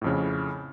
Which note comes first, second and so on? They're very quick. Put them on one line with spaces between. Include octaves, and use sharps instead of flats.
A2 F2 C#3